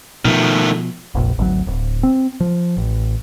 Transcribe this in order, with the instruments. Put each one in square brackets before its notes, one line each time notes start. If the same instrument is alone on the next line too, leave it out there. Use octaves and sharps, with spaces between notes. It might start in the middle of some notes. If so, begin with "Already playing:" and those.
[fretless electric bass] B2 F3 [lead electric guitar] D#3 A3
[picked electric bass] F1 A#1
G#1 D2 F3 F#3
D1
C4
F3
A1